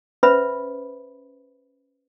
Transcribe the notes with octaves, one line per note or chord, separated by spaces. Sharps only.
C#4 B4 C5 E5 B5